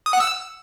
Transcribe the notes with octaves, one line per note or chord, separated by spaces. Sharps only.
D#6
F#5
E6